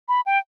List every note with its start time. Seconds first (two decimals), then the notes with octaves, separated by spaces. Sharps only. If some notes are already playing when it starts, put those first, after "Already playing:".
0.09 B5
0.26 G5